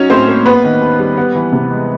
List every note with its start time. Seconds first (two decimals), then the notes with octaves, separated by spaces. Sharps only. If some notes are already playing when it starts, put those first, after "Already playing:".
Already playing: F#3 C#4 D#4 C#5
0.10 A2 C4 C5
0.28 A#3
0.46 B3 B4
0.64 D#3
0.81 D#2
0.99 G3
1.17 B3
1.35 E3
1.52 C3
1.71 G#3